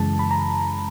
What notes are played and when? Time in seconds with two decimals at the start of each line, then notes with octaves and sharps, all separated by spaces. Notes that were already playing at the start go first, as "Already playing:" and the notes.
Already playing: F#2 C#3 E3 G#3 A5
0.19 B5
0.31 A#5